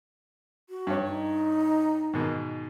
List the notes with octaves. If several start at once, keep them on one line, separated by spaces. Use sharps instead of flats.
F#4
G2 C#5
D#4
G#2 B2 D#3